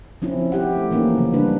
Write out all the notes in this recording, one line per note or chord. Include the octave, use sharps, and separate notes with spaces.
F3 C4 C#4 E4
E4 G4 F#5
A3
E3 F3 A#3 C#4 D#4
C#3 E3 F#3
G3 D4 B4